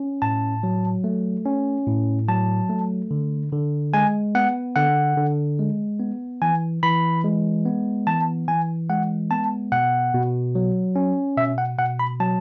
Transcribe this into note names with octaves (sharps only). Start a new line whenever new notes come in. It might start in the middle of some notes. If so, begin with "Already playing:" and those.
Already playing: C#4
A2 A5
F#3
A3
C#4
A2
F#3 A5
A3
D3
D3
G#3 G#5
B3 F#5
D3 F#5
D3
G#3
B3
E3 G#5
E3 B5
G#3
B3
E3 A5
E3 G#5
G#3 F#5
B3 A5
B2 F#5
B2
F#3
C#4
B2 E5
F#5
B2 F#5
B5
F#3 A5